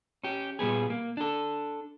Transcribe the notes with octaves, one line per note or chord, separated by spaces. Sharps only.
C#4 G4
A#2 G3 B3 G#4
A#3
D4 A4